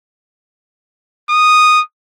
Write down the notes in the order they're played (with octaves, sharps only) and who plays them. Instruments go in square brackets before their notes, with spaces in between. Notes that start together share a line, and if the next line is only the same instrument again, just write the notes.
[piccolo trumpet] D#6